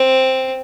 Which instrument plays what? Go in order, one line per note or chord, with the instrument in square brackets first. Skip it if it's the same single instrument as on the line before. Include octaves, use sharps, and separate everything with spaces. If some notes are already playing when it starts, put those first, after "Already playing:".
Already playing: [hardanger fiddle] C4